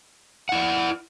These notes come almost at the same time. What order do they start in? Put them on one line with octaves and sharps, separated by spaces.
F#5 E4 D5